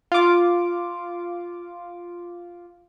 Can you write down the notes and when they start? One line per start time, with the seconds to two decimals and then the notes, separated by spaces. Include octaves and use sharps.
0.12 F4 D6